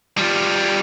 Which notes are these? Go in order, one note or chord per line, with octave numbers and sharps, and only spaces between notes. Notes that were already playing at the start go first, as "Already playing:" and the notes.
G3 F4